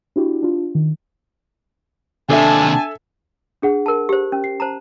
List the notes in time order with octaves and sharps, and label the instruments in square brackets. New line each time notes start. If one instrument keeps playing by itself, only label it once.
[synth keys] D4 E4 F#4 G4
D4 F4
D#3
[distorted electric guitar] D#2 C3 [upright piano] D4 [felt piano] A4 E5 [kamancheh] G#5 A5
[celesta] D4 G#4 F#5
[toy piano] A#4 A5
G4 C5
C#4
[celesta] C7
[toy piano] C5 A5 A#5